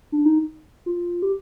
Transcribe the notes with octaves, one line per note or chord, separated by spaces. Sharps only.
D4
D#4
F4
G4